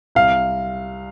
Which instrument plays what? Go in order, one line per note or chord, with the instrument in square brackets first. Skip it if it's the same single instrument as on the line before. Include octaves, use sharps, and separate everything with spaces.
[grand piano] C2 F5